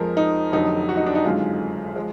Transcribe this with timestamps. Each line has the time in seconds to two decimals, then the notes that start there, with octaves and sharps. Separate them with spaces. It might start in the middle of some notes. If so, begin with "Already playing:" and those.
Already playing: F2 F3 G#3 A#4
0.17 D#4
0.52 F1 F2 D3 F#3 D#4
0.89 F#4
0.97 D#4
1.06 D4
1.15 D#4
1.24 G#1 F#2 D3 G#3 F4
1.96 F3 G#3